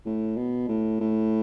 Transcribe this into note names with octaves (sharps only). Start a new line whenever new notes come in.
A2
B2
A2
A2